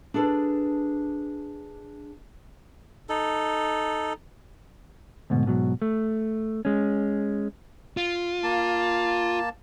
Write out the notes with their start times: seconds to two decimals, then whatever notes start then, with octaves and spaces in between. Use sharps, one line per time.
0.14 D4 G#4 A4 B4
3.09 D#4 A4
5.30 D2 G#2 B2
5.46 G#2 B2 F#3
5.82 A3
6.65 G#3 C#4
7.97 F4
8.43 A#3 A5